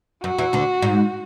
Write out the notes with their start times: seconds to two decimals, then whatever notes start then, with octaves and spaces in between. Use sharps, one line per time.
0.24 F#2 F#4
0.38 E2 E3
0.53 D2 D3
0.82 G#2